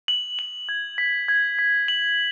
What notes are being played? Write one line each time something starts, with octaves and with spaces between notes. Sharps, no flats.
F#7
F#7
G#6
B6
G#6
B6
F#7